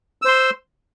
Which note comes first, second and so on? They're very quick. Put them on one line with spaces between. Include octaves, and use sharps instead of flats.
E6 C5 C6